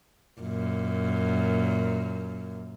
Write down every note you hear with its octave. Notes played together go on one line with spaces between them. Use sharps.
F#2 A#2